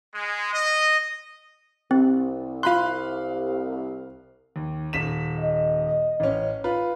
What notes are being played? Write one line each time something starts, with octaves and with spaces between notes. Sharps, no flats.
G#3
D#5
C2 C4
F4 F5 B5 C6 F#6
D#2
D#1 B6 E7
D#5
A1 C#4
F4 B4